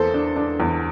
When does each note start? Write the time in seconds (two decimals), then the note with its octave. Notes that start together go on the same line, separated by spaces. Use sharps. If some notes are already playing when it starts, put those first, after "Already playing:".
Already playing: E2 A#3 A4 C5
0.14 D4
0.36 D4
0.60 E2